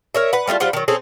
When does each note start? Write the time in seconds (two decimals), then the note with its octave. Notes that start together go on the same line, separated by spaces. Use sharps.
0.15 A#4 C#5 E5
0.33 B4 F#5
0.47 G3 A3 C4 F4
0.60 G3 F4 C5 F#5
0.73 D#3 F#3
0.88 C4 C#4 G#4 A4